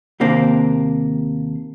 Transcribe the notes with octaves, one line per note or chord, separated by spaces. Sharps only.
D#2 C3 A#3 D4 C5